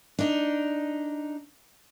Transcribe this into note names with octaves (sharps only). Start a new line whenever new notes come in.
D4 D#4